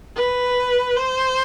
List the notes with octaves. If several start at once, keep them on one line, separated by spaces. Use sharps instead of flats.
B4
C5